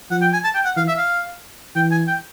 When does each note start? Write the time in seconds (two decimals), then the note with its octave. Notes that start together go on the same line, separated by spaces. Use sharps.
0.11 F3 F#5
0.21 G5
0.33 G#5
0.44 A5
0.55 G5
0.65 F#5
0.77 E3 F5
0.88 E5
0.98 F5
1.76 E3 G5
1.91 G#5
2.08 G5